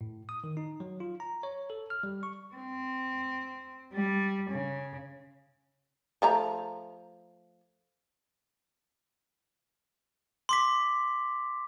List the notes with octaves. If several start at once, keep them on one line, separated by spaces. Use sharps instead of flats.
A2
D#6
D#3
D#4
F#3
F4
A#5
C#5
A4
F6
G3
C#6
C4
G3
C#3
F3 A3 A#5
C6 D6 B6